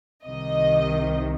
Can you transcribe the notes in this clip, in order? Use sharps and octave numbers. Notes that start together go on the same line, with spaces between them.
C2 C3 D#3 D#5